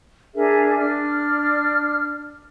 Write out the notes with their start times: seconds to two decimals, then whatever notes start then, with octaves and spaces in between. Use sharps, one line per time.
0.36 D4 G#4 A#4 E5
0.79 D4 F6